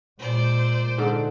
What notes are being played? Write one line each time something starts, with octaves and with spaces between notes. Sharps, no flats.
A#2 G#3 C5 D5
G#2 D3